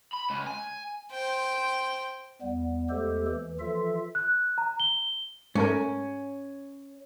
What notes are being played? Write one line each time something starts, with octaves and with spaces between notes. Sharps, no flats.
B5
C#2
G#5
C5 G5
E2 G3 B3
E2 G#3 A3 G4 A4 C5
D#2 E3
E3 F3 F4 A4 E5
F#6
A#5
G7
G#2 A3 C#4 A#4